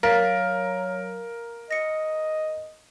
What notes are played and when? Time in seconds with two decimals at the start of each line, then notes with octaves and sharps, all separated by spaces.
0.03 F#3 A#4 F5 A6 B6
1.71 D#5 A#6 C#7